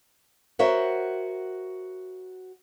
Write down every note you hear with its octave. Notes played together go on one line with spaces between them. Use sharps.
F#4 A#4 C5 C#5 E5 F#5